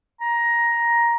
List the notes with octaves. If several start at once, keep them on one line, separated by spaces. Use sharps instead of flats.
A#5